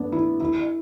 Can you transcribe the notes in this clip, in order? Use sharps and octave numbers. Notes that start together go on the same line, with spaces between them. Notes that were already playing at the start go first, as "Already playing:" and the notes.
Already playing: A3 B3 D4
E4
E4